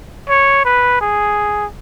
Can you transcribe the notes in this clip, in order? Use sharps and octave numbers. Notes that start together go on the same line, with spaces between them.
C#5
B4
G#4